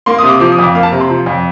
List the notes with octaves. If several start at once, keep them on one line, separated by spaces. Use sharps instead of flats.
A#3 C6
C3 D#6
D6
F3 D6
D#6
F2 D6
A#3 F5
A5
C3 A#5
C6
F3
F2